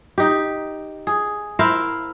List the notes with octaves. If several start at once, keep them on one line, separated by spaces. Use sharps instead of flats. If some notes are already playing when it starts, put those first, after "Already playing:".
D#4 G4
G#4
E4 A#4 C5 F5